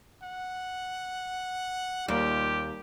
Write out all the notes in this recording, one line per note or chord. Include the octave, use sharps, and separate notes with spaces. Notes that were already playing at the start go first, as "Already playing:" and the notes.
F#5
D#2 G3 A#3 F4 G4